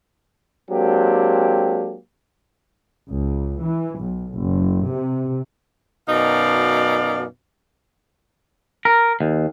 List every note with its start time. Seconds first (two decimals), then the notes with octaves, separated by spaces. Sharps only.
0.70 F#3 G#3 A#3 C4 D4 G4
3.12 C#2
3.63 E3
4.02 B1
4.40 F#1
4.92 C3
6.09 F#2 B2 D#4 D5 F5
8.85 A#4
9.21 D#2